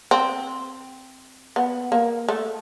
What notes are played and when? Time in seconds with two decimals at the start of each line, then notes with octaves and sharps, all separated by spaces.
0.11 C4
1.56 B3
1.92 A#3
2.29 A3